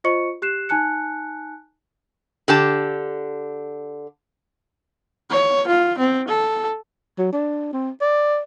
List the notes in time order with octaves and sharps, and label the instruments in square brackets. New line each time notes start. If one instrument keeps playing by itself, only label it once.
[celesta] F4 C5 D#5 C#6 C#7
G4 F#6 C7 E7
D#4 G#5 A5 F#6 C#7
[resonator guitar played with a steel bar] D3 G4 A5
[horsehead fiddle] C#5
F4
C4
A4
[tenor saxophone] F#3
D4
C4
D5